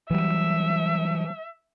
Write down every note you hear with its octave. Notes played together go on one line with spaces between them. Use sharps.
E3 F#3 G3 E5